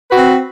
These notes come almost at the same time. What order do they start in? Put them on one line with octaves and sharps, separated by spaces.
B4 F#4 C4